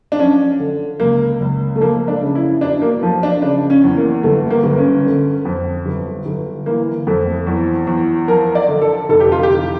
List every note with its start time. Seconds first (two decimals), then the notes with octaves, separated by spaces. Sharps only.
0.12 D4
0.19 F3 C#4
0.59 D3
1.00 C#2 A#3
1.41 C#2
1.75 A3
1.81 F3 A#3
2.08 D4
2.22 C#3
2.35 E4
2.61 E1 D4
2.82 A#3
3.03 F3
3.23 D4
3.42 C#3 D4
3.70 C#4
3.84 E2
3.97 A#3
4.23 G1 A3
4.50 A#3
4.64 G1
4.78 C#4
5.05 D3
5.45 F2
5.86 G1
6.26 G1
6.66 E3 A#3
7.07 F2 A3
7.47 E2
7.87 E2
8.28 F3 A#4
8.55 D5
8.68 D3
8.82 A4
9.09 F1 A4
9.20 G4
9.32 F4
9.43 G4
9.50 E3